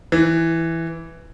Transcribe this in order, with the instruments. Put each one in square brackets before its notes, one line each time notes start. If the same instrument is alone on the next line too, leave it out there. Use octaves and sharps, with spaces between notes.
[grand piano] E3